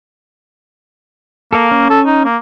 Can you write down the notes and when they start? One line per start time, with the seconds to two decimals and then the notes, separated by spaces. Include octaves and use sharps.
1.53 A#3 A4 A#4 F5
1.71 C#4
1.90 A4
2.06 D#4
2.25 A#3